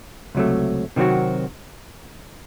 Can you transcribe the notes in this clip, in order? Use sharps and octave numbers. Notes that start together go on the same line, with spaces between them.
C#2 C3 F#3 A3
C3 D#3 F#3 C4 F#4